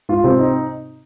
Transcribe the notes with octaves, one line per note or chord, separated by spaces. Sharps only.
G#2 F4
G#2 C3 C4
D#4